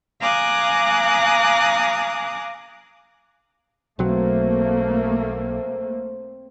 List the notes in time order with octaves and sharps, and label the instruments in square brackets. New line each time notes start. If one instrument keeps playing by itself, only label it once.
[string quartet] F5 G#5 A#5 D6 D#6 F#6
[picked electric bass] B1 F#3 [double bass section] A3 A#3 [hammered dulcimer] C4